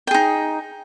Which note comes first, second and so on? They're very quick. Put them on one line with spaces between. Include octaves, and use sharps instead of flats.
G5 G#4 D#4